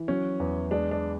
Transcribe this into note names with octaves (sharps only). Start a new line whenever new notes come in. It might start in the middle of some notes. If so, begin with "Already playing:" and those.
Already playing: E3
F#3 C#4
E2
G#3 D4
D4